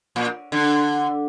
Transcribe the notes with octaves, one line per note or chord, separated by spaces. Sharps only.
A#2
D3